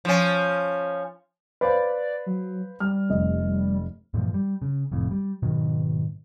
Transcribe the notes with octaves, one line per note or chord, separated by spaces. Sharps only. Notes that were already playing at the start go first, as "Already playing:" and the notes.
F3 C#4
B4 C5 D5 F5
F#3
G3 F6
F1 D#5
G2 A#2 E3 F3
G3
C#3
F1 F2 A2
G3
G#2 B2 D#3 F#3